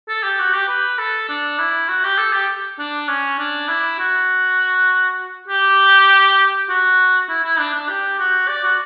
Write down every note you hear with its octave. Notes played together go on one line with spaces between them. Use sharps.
A4
G4
F#4
G4
B4
A4
D4
E4
F#4
G4
A4
G4
D4
C#4
D4
E4
F#4
G4
F#4
E4
E4
D4
D4
G4
F#4
D5
F#4